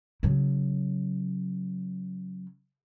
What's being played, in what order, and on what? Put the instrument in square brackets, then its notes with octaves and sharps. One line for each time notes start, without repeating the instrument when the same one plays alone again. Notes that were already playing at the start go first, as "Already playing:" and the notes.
[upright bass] C#3 F#3